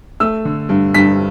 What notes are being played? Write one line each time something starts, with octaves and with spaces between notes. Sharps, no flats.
A3 E6
D3
G2
G2 B6